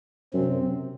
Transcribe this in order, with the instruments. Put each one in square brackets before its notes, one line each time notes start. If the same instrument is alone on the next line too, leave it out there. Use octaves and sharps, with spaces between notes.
[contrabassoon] F#2 [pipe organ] C3 C4